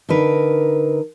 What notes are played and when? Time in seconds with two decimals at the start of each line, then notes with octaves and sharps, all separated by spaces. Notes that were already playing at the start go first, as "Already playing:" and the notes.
0.09 D3 D#4 A#4 B4